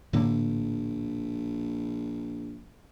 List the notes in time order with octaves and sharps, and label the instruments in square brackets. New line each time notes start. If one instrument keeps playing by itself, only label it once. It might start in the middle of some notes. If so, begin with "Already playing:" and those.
[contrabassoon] A#1 [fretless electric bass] A2 D3 A#3